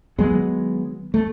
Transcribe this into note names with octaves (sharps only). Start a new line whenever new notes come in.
D#3 F#3 G#3 B3
A3